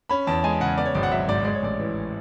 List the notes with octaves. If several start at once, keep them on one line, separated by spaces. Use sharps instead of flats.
C#4 B5
E2 A5
G#3 G#5
C#3 F#5
B3 D5
C#5
G#1 D5
F#5
F#3 E5
G#2 D5
G#3 D5
C#5
A1 D5
E3